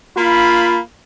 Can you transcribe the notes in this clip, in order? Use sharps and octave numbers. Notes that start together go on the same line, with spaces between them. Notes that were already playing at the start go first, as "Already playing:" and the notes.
A#3 F4 B5